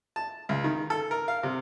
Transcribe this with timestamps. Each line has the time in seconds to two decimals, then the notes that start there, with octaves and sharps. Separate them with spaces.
0.16 A5
0.49 C#2
0.64 D#3
0.90 A4
1.11 A#4
1.28 F5
1.43 C3